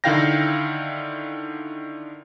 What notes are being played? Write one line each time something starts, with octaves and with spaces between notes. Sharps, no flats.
D3 D#3 E4 F5 G5 A#6